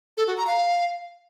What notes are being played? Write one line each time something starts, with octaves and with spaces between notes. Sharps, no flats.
A4
F#4
A#5
F5